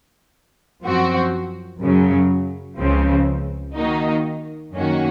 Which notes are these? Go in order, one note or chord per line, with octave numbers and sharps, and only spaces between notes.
F#2 F3 C4 F#4
F#2 C#3 F#3
C#2 C#3 F3 C4
D#3 A#3 D#4 F#4
F#2 D#3 A#3 C#4 F#4